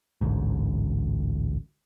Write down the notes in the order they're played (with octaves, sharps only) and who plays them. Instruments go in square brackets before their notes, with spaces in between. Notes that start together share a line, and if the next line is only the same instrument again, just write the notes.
[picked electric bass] A1 D2 G#2